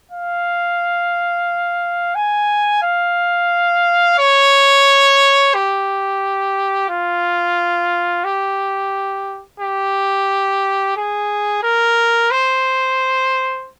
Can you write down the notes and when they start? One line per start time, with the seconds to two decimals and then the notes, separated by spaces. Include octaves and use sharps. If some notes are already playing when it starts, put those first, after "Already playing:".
0.11 F5
2.15 G#5
2.83 F5
4.19 C#5
5.55 G4
6.89 F4
8.24 G4
9.60 G4
10.96 G#4
11.63 A#4
12.31 C5